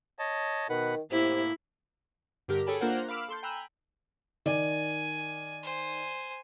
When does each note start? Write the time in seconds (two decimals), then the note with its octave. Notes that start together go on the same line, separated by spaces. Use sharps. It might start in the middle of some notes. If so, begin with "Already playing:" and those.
0.19 C#5 D#5 A5
0.69 B2 D#3 B4 F#5
1.11 A2 C3 A#3 E4
2.48 G2 D3 G4 A#4
2.67 G#4 A4 C#5 G5 A5 B5
2.81 A#3 D4 F4 A#4 C5 F#5
3.08 F5 B5 D6 E6 F6
3.29 A4 C6 G6
3.43 G5 G#5 A#5 B5 E6 F#6
4.46 D#3 D5 G#5
5.63 C5 G#5